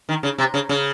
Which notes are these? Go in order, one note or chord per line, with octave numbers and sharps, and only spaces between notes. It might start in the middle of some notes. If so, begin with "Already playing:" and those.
D#3
C#3
C3
C#3
C#3